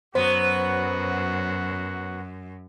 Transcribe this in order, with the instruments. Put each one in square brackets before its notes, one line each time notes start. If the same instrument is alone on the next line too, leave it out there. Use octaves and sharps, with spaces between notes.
[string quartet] F#2 [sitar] F#3 B3 [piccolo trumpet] F#4 [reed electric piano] C5